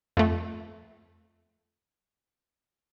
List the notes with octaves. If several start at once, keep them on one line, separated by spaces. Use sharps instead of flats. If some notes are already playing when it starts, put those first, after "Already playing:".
F2 A3